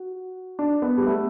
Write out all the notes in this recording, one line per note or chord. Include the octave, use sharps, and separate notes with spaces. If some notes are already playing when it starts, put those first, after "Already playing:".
Already playing: F#4
D4
B3
G3
A3